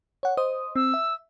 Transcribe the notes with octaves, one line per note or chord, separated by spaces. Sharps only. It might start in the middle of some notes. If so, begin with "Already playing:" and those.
C#5 F#5
C5 D#5 D#6
C4 E6
E5